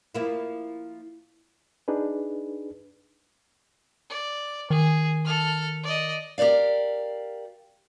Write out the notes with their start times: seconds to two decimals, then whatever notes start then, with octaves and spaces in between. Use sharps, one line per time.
0.15 F3 A#3 E4
1.88 D4 D#4 G#4 B4
4.10 D5
4.70 D#3 G#4
5.25 A4 F6
5.83 D5 D#5
6.38 G4 A#4 C5 D5 F5